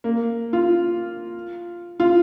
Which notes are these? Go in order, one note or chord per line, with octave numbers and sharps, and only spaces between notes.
A#3
F4
F4